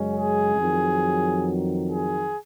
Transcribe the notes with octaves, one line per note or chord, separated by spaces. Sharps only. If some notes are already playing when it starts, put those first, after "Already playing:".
Already playing: F#2 C#3 G#3 C#4
G#4
F2 D#3 F#3
G#4